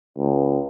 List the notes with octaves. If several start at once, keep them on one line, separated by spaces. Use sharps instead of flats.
C#2